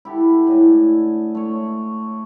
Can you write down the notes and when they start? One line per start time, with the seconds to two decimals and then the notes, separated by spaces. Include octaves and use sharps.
0.05 E4 G4 A4 F#5
0.47 A2 D4 D#5 G#5
1.35 A3 C#5